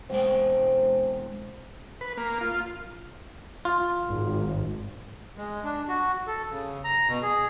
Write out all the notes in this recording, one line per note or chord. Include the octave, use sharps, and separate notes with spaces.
B2 G#3 C4 G5
B4
A#3
F4
F4
G#1
G#3
D4
F#4
A4
C#3
A#5
B2
G#4